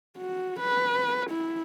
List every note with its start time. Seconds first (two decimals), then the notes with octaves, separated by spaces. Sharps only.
0.18 F#4
0.60 B4
1.30 E4